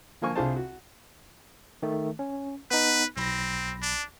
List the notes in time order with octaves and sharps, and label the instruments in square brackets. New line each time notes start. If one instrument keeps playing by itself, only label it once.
[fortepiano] D3 F3 A#3 G#5 C#6
C2 D4 F4 G#4 C5 A5
F#4
[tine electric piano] D#3 A3
C#4
[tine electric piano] B3 D#4 [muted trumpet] B4
[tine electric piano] B1 B5 A#6 [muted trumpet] C4
[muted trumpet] D4